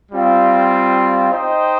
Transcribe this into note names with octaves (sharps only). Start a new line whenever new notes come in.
G3 C4 F4
D#4 C5 D#5 G5